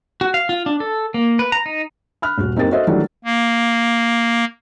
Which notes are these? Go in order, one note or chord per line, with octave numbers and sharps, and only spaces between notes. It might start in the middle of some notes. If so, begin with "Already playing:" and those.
F#4
F5
F4
D4
A4
A#3
B4
A#5
D#4
B5 F6 F#6
D#1 F#4
F#1 C4 D#4 G4 A#4 A6
F#4 A4 C5 D#5 E5
D#3 E3 F#3 G3 A3 D4
A#3